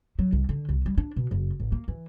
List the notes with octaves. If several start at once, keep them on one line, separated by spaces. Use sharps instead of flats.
F#3
C2
D3
C2
G3
D4
B2
F#1
A1
A#3
E3